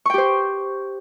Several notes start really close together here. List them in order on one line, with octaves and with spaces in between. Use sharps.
C#6 G5 G4 C5